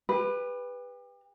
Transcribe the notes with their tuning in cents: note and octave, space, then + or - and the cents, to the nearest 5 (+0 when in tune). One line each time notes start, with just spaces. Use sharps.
G4 +35 B4 +0